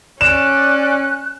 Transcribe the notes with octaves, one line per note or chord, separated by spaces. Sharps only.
C#4 D5 F#6 E7